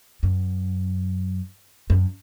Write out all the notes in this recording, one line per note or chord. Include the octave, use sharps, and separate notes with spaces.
F#2
F#2